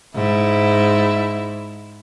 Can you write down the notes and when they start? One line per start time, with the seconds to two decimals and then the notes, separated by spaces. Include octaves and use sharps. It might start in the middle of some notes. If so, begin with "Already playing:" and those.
0.15 G#2 E4